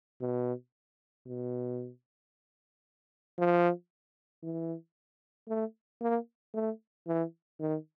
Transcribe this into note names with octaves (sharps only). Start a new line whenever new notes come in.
B2
B2
F3
E3
A3
A#3
A3
E3
D#3